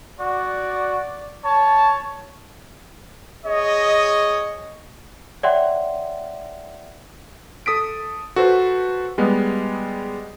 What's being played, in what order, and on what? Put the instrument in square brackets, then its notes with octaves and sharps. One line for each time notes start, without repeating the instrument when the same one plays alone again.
[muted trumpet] F#4 [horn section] D5
[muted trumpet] C#5 [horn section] A5
[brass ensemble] G#4 C#5 D#5
[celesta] C#5 D5 E5 F#5 G5 C6
[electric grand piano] A4 D#6 B6 D7
F#4 A4 B4 C5
G3 G#3 B3